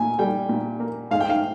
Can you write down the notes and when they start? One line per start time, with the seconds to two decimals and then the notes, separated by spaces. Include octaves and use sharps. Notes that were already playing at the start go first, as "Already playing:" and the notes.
Already playing: A#2 A#3 G#5
0.19 G3 G5
0.49 A#2
0.80 A#3
1.11 G#2 F5
1.20 G5
1.30 F5